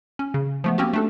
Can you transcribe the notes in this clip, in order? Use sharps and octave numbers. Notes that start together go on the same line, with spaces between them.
C#4
C#3
F3 A3 B3
A#3 C4 C#4 F#4 G4
A3 D4 A4